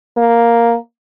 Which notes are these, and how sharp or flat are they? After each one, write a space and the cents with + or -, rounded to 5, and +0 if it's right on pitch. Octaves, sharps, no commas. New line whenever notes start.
A#3 +0